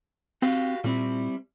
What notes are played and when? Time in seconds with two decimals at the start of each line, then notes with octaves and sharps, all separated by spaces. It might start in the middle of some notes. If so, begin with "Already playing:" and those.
0.42 C4 F#4 G4 F5
0.84 A#2 G3 C4 E4